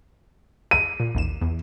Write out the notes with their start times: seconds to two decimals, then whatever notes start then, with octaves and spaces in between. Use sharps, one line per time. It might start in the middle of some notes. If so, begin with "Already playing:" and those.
0.71 D#7
1.00 A#2
1.15 A1 D#2 E7
1.41 E2